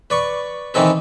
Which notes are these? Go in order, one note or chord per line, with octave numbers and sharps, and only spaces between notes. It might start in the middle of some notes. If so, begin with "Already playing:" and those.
B4 D5 C#6
D#3 E3 C4 D#4 A4 B4